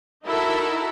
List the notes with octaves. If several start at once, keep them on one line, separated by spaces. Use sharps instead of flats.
D#4 E4 F#4 A4 A#4 E5